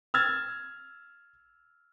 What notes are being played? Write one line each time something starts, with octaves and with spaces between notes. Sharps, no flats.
E6 F6 G#6 A6